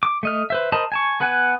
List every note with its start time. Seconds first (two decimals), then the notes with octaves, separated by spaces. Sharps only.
0.03 D6
0.23 A3 D#5 F6
0.50 B4 C5 E5
0.72 A#4 C5 D#5 A5 B5
0.92 G#5 A5 C#6
1.20 B3 B4 F#5 G#5